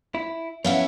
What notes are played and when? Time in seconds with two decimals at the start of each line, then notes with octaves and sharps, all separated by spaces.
0.15 E4
0.65 B3 C#4 E4 C#5 F5 F#5